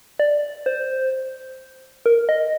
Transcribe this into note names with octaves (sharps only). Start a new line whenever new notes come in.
D5
C5
A#4
D#5